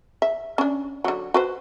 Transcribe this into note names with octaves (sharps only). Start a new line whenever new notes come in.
E5
C#4 D4
D3 F#3
F#4 B4 C5